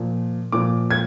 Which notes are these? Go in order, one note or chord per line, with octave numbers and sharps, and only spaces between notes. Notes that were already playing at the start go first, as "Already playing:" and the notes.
Already playing: A#2 F3
A#2 F3 D6
G#6